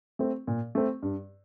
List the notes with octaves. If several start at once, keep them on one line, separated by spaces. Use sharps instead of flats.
A3 C4
A#2
A3 C4
G2